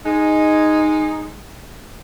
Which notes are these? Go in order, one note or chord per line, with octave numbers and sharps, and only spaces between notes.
G#3 D#4